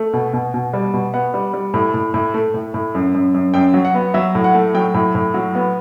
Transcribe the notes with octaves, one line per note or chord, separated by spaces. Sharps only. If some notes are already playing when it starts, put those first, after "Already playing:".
Already playing: A3
B2
B2
B2
G3
B2
B3 F#5
G3
G3
A2
A2
A2
A3
A2
A2
F#2
F#2
F#2
F#2 G5
F#3
F#5
B3
F#3 E5
A2
F#5
A3
F#3 G5
A2
A2
F#3
B3